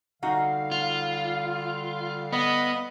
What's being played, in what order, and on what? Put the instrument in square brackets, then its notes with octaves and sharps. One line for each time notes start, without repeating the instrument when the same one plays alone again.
[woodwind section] D3 G3 F5 [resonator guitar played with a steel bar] D#4 F#4 F#5
[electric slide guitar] F4
[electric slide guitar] B3 [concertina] D#5 B5